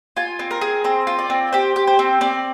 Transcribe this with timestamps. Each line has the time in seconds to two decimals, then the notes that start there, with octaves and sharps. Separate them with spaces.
0.17 F4 G#5
0.39 C4
0.51 A#4
0.61 G#4
0.84 C4 C5
1.07 F4
1.19 D5
1.30 C4
1.53 G4 C5
1.76 G4
1.87 C5
1.99 C4
2.21 C4 D5